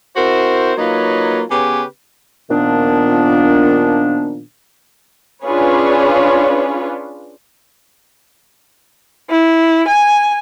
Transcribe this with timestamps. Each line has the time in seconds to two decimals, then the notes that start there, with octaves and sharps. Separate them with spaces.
0.16 C4 E4 F#4 A#4 C5
0.78 F#3 A#3 D#4 F4 B4 C#5
1.50 C#3 B3 G4 B4 C#5 G#5
2.50 A#2 D#3 F3 B3 D4
5.45 C#4 D4 F4 G#4 B4 C#5
9.30 E4
9.88 G#5